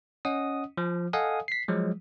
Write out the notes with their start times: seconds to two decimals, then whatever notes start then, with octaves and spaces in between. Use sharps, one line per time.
0.25 C#4 D#5 F#5 D#6
0.77 F3
1.13 A4 D#5 F5 F#5 G#5 D#6
1.48 B6 C7
1.68 F3 F#3 G#3